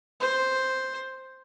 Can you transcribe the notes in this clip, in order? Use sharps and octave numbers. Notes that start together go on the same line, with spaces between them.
C5